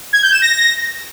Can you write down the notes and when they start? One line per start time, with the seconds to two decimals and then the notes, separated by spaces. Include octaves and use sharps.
0.13 G#6
0.23 G6
0.32 E7
0.42 A#6